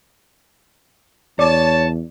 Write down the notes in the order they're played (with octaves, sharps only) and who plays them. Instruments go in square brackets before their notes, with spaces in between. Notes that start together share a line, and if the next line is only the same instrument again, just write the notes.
[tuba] E2 [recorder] C#5 [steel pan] D5 [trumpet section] A5